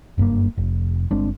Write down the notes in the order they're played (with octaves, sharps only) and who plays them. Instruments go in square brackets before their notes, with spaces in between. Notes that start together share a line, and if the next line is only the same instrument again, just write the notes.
[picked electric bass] F#1 G2 B2 A#3
F1
G1 G#3 C4 D4